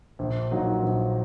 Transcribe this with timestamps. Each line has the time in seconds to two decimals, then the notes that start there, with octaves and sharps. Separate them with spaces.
0.19 A#1
0.51 A#2 F#3 D#4 F#4
0.83 A#1